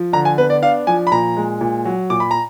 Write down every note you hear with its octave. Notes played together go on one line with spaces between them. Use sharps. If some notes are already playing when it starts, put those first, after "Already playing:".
Already playing: F3
D3 A#5
G#5
B3 B4
D5
D4 F5
F3 G#5
B5
A#2 A#5
G#3
A#2
F#3
A#2 D6
B5
A#5